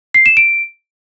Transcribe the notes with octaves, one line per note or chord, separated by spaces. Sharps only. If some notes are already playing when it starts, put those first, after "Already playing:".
C7
E7
D7